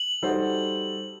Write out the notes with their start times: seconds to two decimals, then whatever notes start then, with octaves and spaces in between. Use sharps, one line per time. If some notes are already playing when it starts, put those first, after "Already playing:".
Already playing: F#7
0.22 G3 D#4 F#4 A4 C5